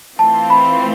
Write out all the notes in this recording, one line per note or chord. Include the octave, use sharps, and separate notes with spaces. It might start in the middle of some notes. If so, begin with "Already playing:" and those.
E3 A3 C4 F4 A5
B5